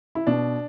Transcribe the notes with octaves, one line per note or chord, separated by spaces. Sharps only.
E4
B2 D4